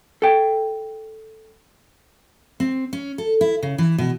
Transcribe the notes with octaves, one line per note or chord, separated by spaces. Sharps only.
A4 G5
C4
C#4
A4
E4
C#3
E3
B2